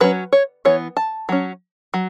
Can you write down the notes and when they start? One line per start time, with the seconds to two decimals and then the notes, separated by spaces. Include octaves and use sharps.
0.01 F#3 C#4 B4
0.33 C#5
0.65 E3 B3 C#5
0.97 A5
1.29 F#3 C#4
1.94 F#3